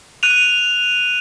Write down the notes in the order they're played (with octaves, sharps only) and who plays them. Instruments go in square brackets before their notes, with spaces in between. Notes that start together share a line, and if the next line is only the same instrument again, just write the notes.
[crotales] F#6 D#7 F7